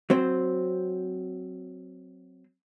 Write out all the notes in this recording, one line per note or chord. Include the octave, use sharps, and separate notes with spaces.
F#3 C4 C5